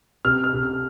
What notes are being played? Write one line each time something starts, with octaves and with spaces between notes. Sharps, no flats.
C3 F6
F6
C3
F6